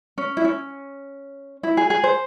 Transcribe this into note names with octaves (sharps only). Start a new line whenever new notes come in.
C#4
E4
C#4
E4
G#4
G#4
C5